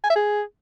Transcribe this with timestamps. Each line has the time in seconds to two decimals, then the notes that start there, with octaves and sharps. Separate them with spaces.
0.04 G#5
0.10 E5
0.16 G#4